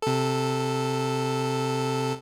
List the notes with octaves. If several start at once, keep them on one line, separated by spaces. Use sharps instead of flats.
C3 A4